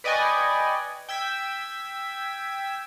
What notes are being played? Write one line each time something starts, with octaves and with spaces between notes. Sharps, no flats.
B4 D5 D#5 G5 G#5 C#6
G5 E6 G#6 B6